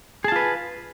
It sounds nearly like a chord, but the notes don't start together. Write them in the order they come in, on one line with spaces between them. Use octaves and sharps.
G#4 A5 F4 B4